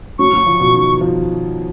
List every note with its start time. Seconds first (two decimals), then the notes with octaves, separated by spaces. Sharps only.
0.19 F#3 C#6
0.33 F#3
0.46 F3
0.60 B2
0.73 D#3
1.01 F3